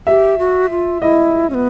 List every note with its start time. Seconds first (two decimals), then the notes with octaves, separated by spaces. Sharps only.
0.07 G4 E5
0.39 F#4
0.70 F4
1.01 E4 D#5
1.50 C#4
1.54 B3